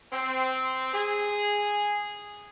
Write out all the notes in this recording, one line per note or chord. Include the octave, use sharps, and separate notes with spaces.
C4
G#4